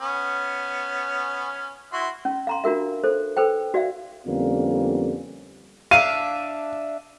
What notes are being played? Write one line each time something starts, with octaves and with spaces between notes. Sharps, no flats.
B3 C#4
E4 F#4 C6
C#4
F5 A#5 C6
D4 F4 F#4 A#4 E5
A4 C5
A4 B4 C5 G5
F#4 D5 E5 F5
F2 D3 G3 A#3 B3 C#4
D4 E5 F5 D#7